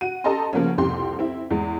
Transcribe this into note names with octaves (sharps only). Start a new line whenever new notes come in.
F#4 D#7
G4 A4 D#5 A5 A#5 C6
C#3 F3 A#3 B3 C#4
C2 F2 G4 C6
C4 E4
E2 G#3